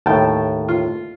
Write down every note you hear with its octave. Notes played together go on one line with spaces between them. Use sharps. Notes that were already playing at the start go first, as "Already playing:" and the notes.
D#2 A2 G5 A5
F4